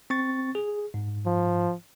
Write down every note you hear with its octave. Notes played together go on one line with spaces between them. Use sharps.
C4 C#6 A6
G#4
G#2
F3